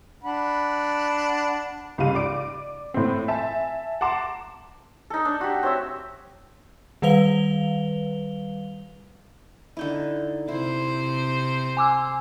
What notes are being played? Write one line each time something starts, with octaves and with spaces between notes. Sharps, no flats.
D4 F#5 B5
C#2 G#2 G3 F5 D#7
D5 D6 D7
A2 C4
E5 G#5 A5
F#5 A5 A#5 C6 D6 E7
D#4 A4
D4
F#4 G4
C4 C#5 E5
D#3 G3 B4 F5 F7 G7
D3 D#4 E4
C3 E4 C5
G#5 D6 E6